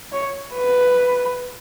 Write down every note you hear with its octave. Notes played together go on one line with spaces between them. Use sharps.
C#5
B4